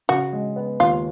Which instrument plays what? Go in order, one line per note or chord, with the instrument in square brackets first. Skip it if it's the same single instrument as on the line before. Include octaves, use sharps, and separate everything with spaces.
[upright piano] C#3 [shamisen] F#4
[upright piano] G#3
B3
[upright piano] D#2 [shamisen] F4